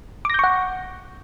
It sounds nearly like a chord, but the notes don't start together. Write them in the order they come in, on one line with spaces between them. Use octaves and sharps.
D6 A#6 G6 C#6 F#5